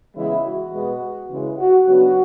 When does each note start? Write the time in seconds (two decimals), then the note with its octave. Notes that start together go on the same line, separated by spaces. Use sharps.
0.15 C#3 E3 G#3 B3 E4
0.44 F#4
0.72 B2 G#3 B3
1.30 C#3 E3 G#3
1.58 F#4
1.86 C#3 F#3 B3 D4 F#4